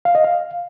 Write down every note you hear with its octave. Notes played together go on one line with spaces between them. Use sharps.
F5
D#5
F5